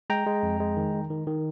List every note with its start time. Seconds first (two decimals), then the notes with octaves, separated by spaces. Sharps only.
0.10 G#3 G5 A#5
0.27 G#3
0.43 F2
0.60 G#3
0.77 D#3
0.94 D#3
1.10 D#3
1.27 D#3